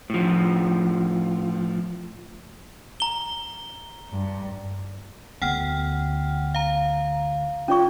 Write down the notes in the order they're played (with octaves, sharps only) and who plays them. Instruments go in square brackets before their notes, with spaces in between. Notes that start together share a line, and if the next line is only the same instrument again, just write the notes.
[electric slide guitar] A2 F3
[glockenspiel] A#5 G7
[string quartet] G2
[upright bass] D2 B3 [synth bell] F#5 G5 F6
[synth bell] F5 A#5
[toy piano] C#4 D5 C#6 [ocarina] F4